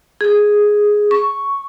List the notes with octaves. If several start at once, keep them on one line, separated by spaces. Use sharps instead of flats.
G#4
C#6